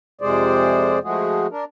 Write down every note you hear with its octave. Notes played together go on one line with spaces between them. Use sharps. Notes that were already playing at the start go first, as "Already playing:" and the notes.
F2 C3 G#3 G#4 C5 D5
F3 G#3 A3 F#4 G#4
D4 A#4